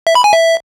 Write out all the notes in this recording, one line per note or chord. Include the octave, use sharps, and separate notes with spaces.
E5
B5
G#5
E5